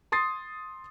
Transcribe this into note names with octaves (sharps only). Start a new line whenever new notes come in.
C6 D#6 A6 C7